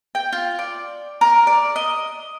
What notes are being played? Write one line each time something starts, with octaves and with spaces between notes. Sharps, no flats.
G5
F4
D5
A#4
D5
D#5